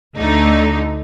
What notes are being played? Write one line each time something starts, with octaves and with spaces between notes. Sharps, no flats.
D2 D3 A3 D#4